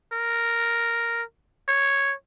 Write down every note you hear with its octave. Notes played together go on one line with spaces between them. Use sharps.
A#4
C#5